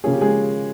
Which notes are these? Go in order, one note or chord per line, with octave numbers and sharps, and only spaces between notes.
C#3 F3 A#3 C#4 G#4
G4
G#3 G#4